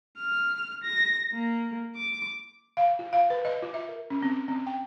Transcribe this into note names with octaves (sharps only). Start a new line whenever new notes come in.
F6
A#6
A#3
D6
F5
F4
F5
B4
D#5
F4
E5
A#4
C#4
C4
C4
G5